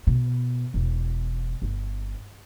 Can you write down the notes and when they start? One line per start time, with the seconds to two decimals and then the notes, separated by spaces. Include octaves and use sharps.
0.07 B2
0.74 E1
1.62 G1